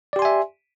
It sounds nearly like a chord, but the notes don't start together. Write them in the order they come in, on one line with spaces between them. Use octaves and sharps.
D5 G4 C6 G#5 E5